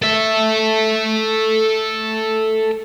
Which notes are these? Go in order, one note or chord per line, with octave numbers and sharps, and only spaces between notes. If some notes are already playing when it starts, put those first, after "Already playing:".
A4 E5